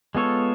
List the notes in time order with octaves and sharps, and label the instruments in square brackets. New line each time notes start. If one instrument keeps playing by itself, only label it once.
[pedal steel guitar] G#3 B3 F4 A4 C#5